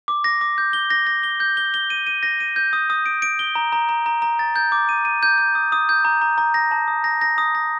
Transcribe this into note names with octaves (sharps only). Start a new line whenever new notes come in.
D6
A#6
D6
G6
G7
A#6
A#6
G7
G6
G7
G7
D#7
D#7
A#6
D#7
G6
D#6
D#6
D7
D7
G7
A#5
A#5
A#5
A#5
A#5
A6
G6
D6
D#7
D#7
G6
G6
D#6
D#6
G6
A#5
A#5
A#5
A#6
A5
D#6
A#6
A#6
D#6
A#6